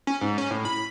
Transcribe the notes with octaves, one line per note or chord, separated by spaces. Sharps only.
C#4
G#2
C#4
A2
B5